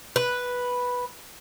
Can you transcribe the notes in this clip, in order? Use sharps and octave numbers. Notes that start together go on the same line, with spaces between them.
B4